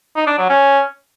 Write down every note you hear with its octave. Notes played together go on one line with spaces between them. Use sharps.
D#4
D4
F#3
C#4